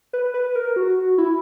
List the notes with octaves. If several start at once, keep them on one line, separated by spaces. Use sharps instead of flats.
B4
B4
A#4
F#4
E4